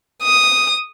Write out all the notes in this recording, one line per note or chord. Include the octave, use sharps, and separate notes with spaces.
D#6